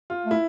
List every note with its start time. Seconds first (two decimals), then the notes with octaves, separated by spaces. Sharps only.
0.10 F4
0.26 A3
0.31 E4